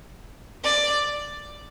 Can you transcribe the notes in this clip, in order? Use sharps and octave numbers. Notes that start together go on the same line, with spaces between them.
D5